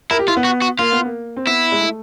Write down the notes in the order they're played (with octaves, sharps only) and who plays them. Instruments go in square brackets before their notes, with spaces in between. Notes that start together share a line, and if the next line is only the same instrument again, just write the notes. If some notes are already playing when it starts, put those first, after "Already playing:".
[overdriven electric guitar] E4 [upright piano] A#4
[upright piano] G4
[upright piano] E4 [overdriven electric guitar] F4
[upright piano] B3
[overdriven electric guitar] F#4
F#4
[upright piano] A#3 [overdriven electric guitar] F4
[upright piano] B3
A#3
C4
[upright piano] B3 [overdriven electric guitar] E4
[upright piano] G#3
A3